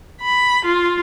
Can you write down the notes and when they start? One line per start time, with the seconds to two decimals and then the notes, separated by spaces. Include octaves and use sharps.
0.21 B5
0.64 F4